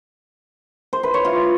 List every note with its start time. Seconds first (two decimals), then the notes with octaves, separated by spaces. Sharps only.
0.93 C5
1.03 B4
1.14 C#5
1.25 F4